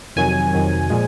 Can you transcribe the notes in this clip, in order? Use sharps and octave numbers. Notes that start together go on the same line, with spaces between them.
F2 C3 D#3 F#3 G#5
F2 C3 D#3 F#3
A#2 F3 G#3